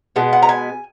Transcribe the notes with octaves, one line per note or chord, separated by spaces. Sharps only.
B2 G#3 B3
F#5
A#5
G#5